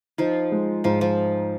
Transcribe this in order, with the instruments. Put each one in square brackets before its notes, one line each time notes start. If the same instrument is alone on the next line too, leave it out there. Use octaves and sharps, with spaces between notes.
[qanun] F3 F4 [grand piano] D#4
[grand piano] G#3
[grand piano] G#2 [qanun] F3 F4
[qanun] F3 F4